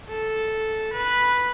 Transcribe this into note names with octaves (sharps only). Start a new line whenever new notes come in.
A4
B4